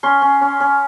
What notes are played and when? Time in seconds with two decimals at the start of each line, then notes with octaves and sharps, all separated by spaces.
0.03 C#4 C6
0.22 C#4
0.41 C#4
0.60 C#4